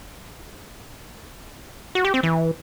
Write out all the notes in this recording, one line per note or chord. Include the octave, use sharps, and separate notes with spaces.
F#4
G4
C4
E3